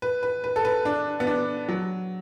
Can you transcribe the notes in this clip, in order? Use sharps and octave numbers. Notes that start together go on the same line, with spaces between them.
B4
B4
B4
A4
B4
D4
B3
D4
F#3